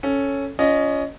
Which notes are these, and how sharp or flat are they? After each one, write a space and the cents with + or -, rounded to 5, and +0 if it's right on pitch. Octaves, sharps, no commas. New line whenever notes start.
C#4 +0 A4 +0
C#4 +20 F4 +0 D#5 -10